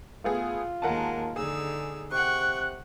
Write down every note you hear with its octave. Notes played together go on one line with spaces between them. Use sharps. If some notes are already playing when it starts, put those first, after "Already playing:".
A3 B3 F4 G#4
D#2 G#3 A#4 F#5 A5
D3 D#4 G#4 E6
C3 F#5 G5 C#6 F#6